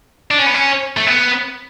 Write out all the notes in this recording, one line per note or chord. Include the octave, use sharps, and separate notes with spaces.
D4
C#4
B3
C#4
A3
B3